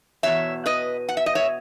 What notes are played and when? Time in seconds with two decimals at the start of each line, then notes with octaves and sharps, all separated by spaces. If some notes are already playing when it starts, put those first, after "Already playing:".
0.23 E2 B2 C#5 E5
0.66 B4 D#5
1.09 F#5
1.17 E5
1.26 D#5
1.35 C#5 E5